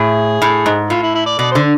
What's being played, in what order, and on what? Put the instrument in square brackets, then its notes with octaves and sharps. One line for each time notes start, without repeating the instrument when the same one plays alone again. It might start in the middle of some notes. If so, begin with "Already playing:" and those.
Already playing: [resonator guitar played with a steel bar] A2 [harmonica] G#4
[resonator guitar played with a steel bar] A2
G#2
[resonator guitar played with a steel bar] A2 [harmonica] F4
[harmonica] E4
E4
D5
[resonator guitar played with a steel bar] B2 [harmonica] D5
[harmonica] C5
[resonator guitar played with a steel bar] D3